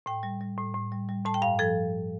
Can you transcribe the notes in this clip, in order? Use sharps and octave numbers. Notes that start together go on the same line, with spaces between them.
A2 G5
G3
G3
A2
A2
G3
G3
A2 A5
G5
G2 F5
F3 A4